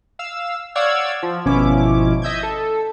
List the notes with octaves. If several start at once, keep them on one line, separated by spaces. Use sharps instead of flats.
F5 E6
C#5 D5 F5 F#5 E6 G#6
F3
G#1 B2 F3 C#4 E4 D6
D#5 E5 G6 G#6
A4